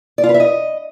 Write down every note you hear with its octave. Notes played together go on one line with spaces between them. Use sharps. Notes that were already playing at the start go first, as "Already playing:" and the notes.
D5
F4
B4
E5
D#5